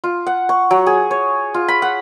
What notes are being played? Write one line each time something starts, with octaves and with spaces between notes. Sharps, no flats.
F4
F#5
C#6
F#3
G#4
C#5
F4
B5
F#5